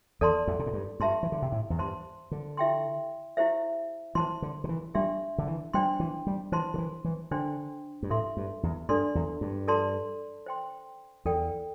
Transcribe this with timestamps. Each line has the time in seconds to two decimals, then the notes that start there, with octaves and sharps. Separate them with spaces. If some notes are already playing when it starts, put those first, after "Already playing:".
0.21 E2 A4 D5 A5 C6
0.47 E2
0.59 C3
0.66 A2
0.73 G2
1.00 G2 G4 E5 A5 C6
1.23 E3
1.32 D3
1.42 C3
1.52 A2
1.70 E2
1.79 G2 C5 A5 C6
2.31 D3
2.57 E4 G4 E5 G5 C6
3.37 E4 G4 C5 E5
4.15 E3 C5 A5 C6
4.42 D3
4.64 D3
4.69 E3
4.94 G3 D4 G4 E5 C6
5.38 D3
5.48 E3
5.74 G3 D4 C5 G5 C6
6.00 E3
6.27 G3
6.52 E3 C5 A5 C6
6.74 D3
6.78 E3
7.04 E3
7.31 D3 D4 C5 G5 C6
8.03 G2
8.10 A2 A4 E5 C6
8.37 G2
8.63 E2
8.89 G2 D4 A4 D5 C6
9.15 E2
9.41 G2
9.68 A4 D5 A5 C6
10.46 C5 G5 C6
11.25 E2 A4 D5 G5